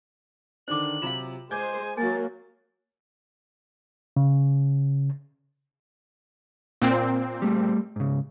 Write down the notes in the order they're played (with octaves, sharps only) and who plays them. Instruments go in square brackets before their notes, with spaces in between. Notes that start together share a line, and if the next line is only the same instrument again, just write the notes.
[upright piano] D3 D#3 D4 [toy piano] C5 D6 [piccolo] F#7
[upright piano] C3 F#3 E7 [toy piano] F4 F5
[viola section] G#3 C5 [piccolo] G#5 [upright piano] D6 G6 G#6
[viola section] F#3 A#3 [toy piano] G#5 [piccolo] A6
[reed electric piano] C#3
[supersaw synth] A#2 C4
[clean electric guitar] G3 A3
G#2 C#3